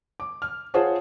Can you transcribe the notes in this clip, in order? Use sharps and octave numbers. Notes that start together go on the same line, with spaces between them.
D6
F6
F4 G#4 C5 C#5 F#5 A5